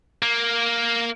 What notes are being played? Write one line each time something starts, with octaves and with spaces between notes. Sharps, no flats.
A#3